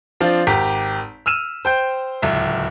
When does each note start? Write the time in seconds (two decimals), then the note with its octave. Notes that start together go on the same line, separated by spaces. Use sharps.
0.20 F3 C4 D4 F4
0.47 G#1 G4 A#5 B6
1.26 E6 F6 D#7 E7
1.65 C5 G5 G6
2.22 D1 C#2 E5